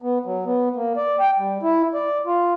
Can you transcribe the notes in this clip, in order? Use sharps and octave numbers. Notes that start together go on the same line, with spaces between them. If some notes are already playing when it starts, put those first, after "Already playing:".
B3
F#3
B3
A#3
D5
G5
G3
E4
D5
F4